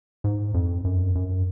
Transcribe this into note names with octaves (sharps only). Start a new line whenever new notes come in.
G#2
F2
F#2
F#2